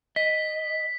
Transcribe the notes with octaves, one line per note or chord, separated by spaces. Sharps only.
D#5 B6